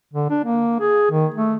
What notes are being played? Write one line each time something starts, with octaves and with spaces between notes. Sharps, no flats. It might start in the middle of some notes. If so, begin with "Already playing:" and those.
D3
D4
A#3
G#4
D#3
A3